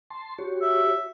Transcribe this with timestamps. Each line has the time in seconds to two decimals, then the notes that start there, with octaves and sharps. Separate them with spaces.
0.10 A5 C6
0.38 F#4 G4 C#5
0.62 E5